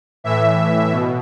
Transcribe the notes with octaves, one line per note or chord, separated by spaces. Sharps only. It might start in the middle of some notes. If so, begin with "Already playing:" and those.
A2 E3 E5
B2